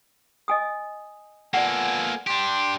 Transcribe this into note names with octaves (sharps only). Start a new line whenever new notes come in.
D#5 G#5 D#6
A#3 B3 F4 A4 D5 F#5 G#5
D4 G4 G5 C6